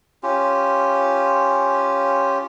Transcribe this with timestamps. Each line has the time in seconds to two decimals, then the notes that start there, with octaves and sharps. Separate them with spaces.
0.23 C#4 F4 G4